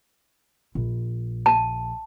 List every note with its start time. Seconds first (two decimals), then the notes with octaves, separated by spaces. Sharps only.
0.75 A#1
1.46 A5